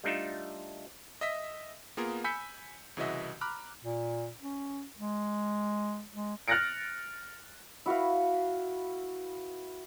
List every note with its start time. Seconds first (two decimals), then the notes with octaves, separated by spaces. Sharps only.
0.04 G3 A3 D4 D#4 F4 A4
1.21 D#5 E5 B6
1.97 A#3 B3 F4 G#4 A#4
2.24 G#5 B5 E6 G6 B6 C#7
2.97 C2 C#3 E3 F#4 D#5 E5
3.41 A#5 B5 D6 F6 F#6
3.82 A#2
4.40 C#4
4.99 G#3
6.13 G#3
6.48 F6 F#6 A6 A#6 C#7 D7
7.86 E4 F#4 B4 F5